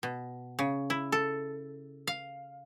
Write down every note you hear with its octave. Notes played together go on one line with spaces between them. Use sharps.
B2
C#3
E4
A4
F5